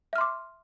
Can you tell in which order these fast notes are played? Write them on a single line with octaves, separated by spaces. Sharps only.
E5 F6 C6 D6